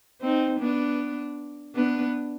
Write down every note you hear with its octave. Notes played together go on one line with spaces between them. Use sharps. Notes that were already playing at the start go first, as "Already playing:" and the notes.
C4 D#4
B3 D4
B3 D4